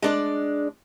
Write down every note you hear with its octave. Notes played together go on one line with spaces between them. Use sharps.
G#3 D4 D5